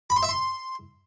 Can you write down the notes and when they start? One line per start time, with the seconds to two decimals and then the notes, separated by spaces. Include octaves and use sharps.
0.10 B5
0.16 C6
0.23 E5
0.29 C6